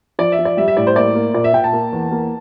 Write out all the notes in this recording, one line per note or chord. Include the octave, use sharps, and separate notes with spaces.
F3 D5
E5
F3
D5
G3 E5
E5
A2 D5
C5
A#3 D5
A#3
A#2 D5
E5
A#2 G5
A5
A#3
E2
A#3